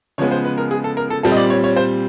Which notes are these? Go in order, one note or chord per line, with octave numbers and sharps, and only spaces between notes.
C#3 F3 G#3 B3 C#5
C5
B4
A#4
G#4
A4
A#4
A4
A#2 G3 C4 A4
D#5
D5
C#5
C#5
C5